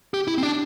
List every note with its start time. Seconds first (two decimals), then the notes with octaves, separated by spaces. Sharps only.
0.14 G4
0.27 E4
0.38 C4
0.43 D4